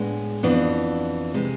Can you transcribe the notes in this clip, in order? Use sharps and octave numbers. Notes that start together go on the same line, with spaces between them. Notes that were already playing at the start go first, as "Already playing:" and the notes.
Already playing: A2 G#3 B3 D4
F2 E3 B3 D4
C3 G#3